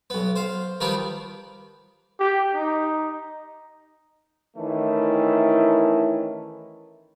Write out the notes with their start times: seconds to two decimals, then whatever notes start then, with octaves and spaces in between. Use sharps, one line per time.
0.10 B1 B3
0.36 C5 F5
0.80 D#3 F3 G3 B3 D#4
2.19 G4
2.55 D#4
4.57 D#3 E3 A3 C#4 E4